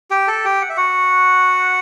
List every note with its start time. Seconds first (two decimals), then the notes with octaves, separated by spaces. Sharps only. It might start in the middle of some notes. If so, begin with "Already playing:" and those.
0.11 G4 G5
0.27 A4 A5
0.45 G4 G5
0.62 F#5
0.70 E5
0.77 F#4 F#5